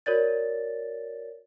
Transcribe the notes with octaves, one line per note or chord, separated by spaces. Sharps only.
F#4 A#4 C#5 D5 A6